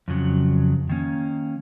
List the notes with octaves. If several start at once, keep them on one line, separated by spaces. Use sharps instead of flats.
F2 C#3 F#3
D#3 A#3 C#4